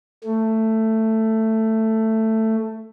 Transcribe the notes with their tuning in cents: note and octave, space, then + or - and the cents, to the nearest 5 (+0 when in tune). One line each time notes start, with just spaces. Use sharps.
A3 +10